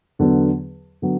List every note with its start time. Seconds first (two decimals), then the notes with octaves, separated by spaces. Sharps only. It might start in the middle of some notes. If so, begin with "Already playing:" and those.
0.19 E2 D3 F#3 B3
1.02 D3 F#3 B3